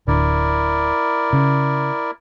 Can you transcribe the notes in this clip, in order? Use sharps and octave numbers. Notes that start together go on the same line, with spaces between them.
D1 D3 E4 A#4 D5
C#3